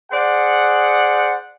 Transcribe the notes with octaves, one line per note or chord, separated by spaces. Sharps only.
G#4 C5 D5 F#5